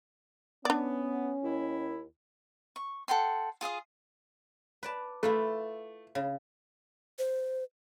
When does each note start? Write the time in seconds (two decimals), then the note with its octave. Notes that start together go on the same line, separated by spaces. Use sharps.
0.65 B3 C#4 D4 D5
1.43 D#2 E4
2.76 C#6
3.08 A4 F#5 G5 C6
3.61 F4 G#4 F5 D#6
4.83 B4 D5 A5
5.23 A3 E4 F4 B4
6.15 C#3
7.19 C5